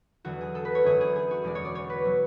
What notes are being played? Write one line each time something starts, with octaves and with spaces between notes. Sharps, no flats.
E2 D3 F#3 F#4
G#4
A4
B4
C#5
F#2 D3 G#3 G#4
G#4
G#4
F#4
E2 B2 G#3 D5
C#5
D5
C#5
B4
B2 F#3